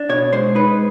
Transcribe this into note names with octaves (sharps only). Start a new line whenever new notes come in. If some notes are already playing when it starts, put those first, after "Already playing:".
Already playing: D4
B2 C#5
G#3 C5
D#4 B4